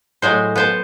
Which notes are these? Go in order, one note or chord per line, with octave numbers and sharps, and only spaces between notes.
A2 F#3 G#3 C5
B3 C5 A5